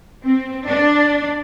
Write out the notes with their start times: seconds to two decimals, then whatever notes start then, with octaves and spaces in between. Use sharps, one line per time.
0.24 C4
0.67 D4